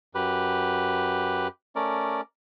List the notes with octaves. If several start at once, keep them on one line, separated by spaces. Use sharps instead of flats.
F#2 G4 B4
A3 C#4 A#4 D5